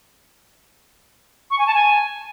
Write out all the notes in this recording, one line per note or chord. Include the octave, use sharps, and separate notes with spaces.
C#6
G#5
A5
G#5